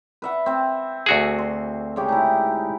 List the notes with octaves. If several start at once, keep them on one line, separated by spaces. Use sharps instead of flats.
B4 E5 F#5
C4 E5
D2 F#4 G#4
C6
C#3 G#3 G4
D#4 E4